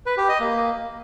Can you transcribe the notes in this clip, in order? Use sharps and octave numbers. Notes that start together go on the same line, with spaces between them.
B4
G4
D#5
A#3